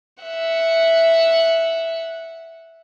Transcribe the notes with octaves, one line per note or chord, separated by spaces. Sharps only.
E5 F#5